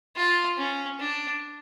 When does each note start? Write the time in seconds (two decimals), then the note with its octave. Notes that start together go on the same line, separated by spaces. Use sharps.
0.17 F4
0.58 C#4
1.00 D4